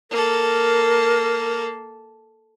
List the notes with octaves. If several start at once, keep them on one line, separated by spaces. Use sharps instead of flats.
A#3 A4 A#4